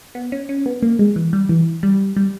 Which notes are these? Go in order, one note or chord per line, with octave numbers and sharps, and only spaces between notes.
B3
C#4
C#4
B3
A#3
G#3
E3
G3
E3
G3
G3